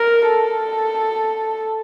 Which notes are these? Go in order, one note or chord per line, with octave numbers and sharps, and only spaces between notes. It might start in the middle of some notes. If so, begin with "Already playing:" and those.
Already playing: A#4
A4